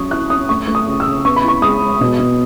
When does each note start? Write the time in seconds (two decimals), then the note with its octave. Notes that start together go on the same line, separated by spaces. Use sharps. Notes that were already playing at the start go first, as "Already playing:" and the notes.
Already playing: F#3 C#4 C#6 D#6
0.11 E4 F#6
0.30 C#4 D#6
0.49 A3 C#6
0.68 A3
0.75 D#6
0.87 C#3
1.00 E6
1.06 C#3
1.25 B3 C#6
1.36 B5
1.43 E4 C#6
1.62 G#3 D#6
1.82 G#3
2.01 B2
2.19 B2